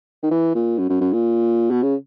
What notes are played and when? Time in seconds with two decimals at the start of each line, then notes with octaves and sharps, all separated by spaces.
0.23 D#3
0.31 E3
0.55 A#2
0.78 F#2
0.89 F#2
1.01 F#2
1.13 A#2
1.71 B2
1.83 C#3